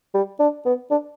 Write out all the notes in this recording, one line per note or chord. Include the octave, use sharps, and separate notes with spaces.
G3
D4
B3
D4